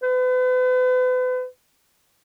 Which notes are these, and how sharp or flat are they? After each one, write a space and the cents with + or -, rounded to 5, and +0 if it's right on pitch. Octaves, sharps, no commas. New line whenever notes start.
B4 +40